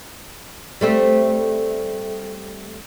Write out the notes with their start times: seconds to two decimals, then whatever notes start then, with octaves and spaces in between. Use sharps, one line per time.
0.81 G3 A3 C4